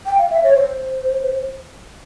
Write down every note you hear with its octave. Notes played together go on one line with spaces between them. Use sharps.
G5
F5
E5
C#5
C5